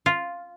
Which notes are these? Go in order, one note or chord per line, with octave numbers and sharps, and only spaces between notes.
F4